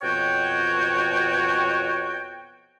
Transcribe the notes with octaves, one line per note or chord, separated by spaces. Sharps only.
F2 B2 F#4 C#5 G5